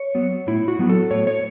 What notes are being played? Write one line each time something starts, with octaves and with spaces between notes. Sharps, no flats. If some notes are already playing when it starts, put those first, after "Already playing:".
Already playing: C#5
F#3 B3
A2 E4
F#4
F#3 B3
A4
A2 C#5
C#5